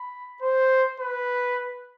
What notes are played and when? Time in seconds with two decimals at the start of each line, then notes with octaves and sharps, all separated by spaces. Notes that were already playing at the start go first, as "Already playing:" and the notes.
Already playing: B5
0.42 C5
1.00 B4